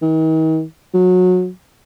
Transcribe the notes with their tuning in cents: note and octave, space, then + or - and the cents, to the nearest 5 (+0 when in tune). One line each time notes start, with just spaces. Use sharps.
D#3 +40
F#3 -25